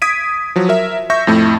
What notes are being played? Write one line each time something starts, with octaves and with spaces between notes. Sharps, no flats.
D#6 G#6 B6 D7 D#7
F3 F#3
A#4 E5
E5 C#6 G6 A#6
F2 A2 A3 A4